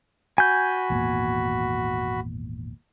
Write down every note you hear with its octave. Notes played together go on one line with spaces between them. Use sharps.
F#4 G#5 B5 G6
G#1 E2 A#2